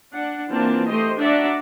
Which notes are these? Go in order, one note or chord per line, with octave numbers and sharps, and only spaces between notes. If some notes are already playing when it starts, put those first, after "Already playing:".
D4 F#5
E3 A#3 C4 D4 F4 A5
A3 G4 C5 D#5 C6
D4 F#4 D5 E5 F#5 A#5